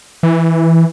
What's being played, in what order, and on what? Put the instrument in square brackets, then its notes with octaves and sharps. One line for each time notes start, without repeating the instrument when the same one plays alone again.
[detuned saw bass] E3